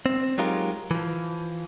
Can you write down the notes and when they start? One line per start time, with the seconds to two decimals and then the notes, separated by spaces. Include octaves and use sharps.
0.06 C4
0.38 F#3 G#3 D#4 F4 G4 A#4
0.91 E3 F3